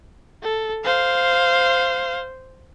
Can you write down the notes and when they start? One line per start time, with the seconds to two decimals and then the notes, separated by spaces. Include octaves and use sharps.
0.43 A4
0.85 C5 F5